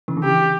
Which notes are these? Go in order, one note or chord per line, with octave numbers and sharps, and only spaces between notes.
C#3 E3
D3
C#3 E3 G4